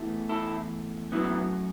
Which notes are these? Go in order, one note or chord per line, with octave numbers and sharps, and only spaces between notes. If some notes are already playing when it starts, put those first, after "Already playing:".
Already playing: E2 E3 A3
E4 A4
F#2 F#3 A3 B3 E4